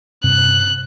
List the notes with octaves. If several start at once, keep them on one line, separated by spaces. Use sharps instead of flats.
G2 C3 F#6